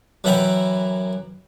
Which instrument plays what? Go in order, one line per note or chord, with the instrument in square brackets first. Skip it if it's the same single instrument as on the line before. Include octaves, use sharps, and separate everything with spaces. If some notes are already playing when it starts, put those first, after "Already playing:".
[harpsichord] F#2 E3 E4 F#5 G5 A#5